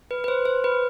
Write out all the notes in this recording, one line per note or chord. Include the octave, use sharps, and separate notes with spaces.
B4
B4
C5
C5
B4